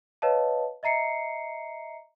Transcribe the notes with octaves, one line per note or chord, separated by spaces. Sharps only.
B4 C#5 D#5 F5 A5
D#5 E5 A#5 C7 C#7